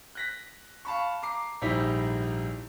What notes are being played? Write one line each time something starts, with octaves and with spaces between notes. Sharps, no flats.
F#6 A#6 B6
F5 A5 B5 C#6
A#5 D6 C7
A#1 G#2 G3 D#4 E4 B6